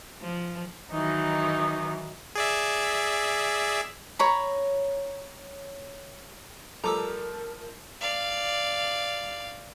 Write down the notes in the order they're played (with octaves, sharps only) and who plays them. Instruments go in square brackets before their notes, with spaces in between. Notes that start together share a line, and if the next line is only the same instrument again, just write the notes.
[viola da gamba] F3
[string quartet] D#3 E3 F#3 [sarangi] D#4
[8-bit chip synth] G#4 D5 E5
[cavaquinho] C#5 A#5 B5
[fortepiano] F3 G3 A3 [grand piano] A4 [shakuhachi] A#4 [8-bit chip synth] A#5 D6 E6
[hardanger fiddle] D5 F5